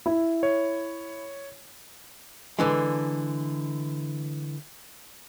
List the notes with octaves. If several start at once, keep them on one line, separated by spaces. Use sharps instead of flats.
E4
C#5
D3 E3 G#3